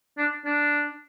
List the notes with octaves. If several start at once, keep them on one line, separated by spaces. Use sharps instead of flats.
D4
D4